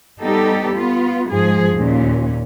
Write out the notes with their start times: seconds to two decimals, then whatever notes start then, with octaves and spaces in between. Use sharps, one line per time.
0.21 G3 B3 D#4 G4 A4
0.75 B3 F4
1.30 G#2 F3 G#4
1.73 D#2 A#2 C#4